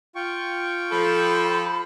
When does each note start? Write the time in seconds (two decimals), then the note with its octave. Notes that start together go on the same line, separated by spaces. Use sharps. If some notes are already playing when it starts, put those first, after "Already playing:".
0.15 F4 G5 C#6
0.91 F3 A4 B5